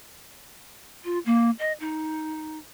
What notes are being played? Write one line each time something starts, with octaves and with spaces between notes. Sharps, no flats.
F4
A#3
D#5
D#4